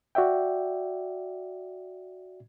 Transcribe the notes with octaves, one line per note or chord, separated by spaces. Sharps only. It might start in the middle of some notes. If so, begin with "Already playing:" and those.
F#4 D5 E5 G5